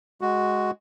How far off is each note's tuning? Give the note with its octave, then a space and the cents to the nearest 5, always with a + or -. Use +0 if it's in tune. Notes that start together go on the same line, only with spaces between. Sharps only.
G#3 +0 F#4 +0